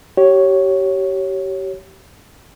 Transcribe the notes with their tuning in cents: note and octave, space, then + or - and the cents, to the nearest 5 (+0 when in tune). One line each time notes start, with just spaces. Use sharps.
G4 -30 C#5 +0